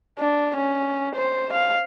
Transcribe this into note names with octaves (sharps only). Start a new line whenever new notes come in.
D4
C#4
C5
F5